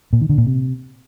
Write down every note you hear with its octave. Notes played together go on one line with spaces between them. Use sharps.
A#2
D#3
D3
A#2
C3